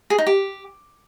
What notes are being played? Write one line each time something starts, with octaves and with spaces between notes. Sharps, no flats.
G#4
D#4
G4